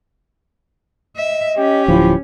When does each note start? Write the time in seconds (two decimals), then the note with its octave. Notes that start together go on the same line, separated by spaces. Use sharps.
1.16 D#5 E5
1.58 C#4 G4
1.88 D1 F3 E4